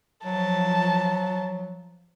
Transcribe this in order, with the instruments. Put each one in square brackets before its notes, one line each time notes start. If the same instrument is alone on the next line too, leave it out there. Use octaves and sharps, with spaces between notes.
[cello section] F3 [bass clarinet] F#3 [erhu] A5